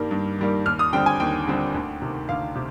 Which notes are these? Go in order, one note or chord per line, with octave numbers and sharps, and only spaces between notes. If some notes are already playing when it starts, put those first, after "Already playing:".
Already playing: G2 D#3 G3 A#3
G2
D#3 G3 A#3
D#2 F6
D#6
D3 G3 C4 G5
G#5
D#2 G5
D3 G3 C4
D2
C3 D#3
D2 F5
C3